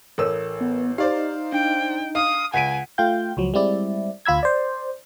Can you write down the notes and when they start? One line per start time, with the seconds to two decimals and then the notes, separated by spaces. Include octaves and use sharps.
0.18 A1 A4 A#4 C#5 E6
0.61 B3
0.98 D#4 G4 C5 D5 F5
1.52 D4 G5
2.15 F5 D#6
2.54 C#2 F#5 G#5 B6 D7 D#7
2.98 A3 F4 F5 G5 G6
3.37 C#2 F3 F#3
3.54 G3 G#3 C4 E4 D5
4.25 D2 F4 B5 E6 G#6
4.43 C5 D5